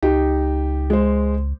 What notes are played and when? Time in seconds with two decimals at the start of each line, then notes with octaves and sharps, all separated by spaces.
0.03 C#2 D#4 G4
0.90 G#3 C5